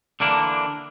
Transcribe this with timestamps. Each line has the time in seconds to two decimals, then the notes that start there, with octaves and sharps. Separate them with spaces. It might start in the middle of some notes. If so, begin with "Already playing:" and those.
0.20 D3 E3 A#3 D4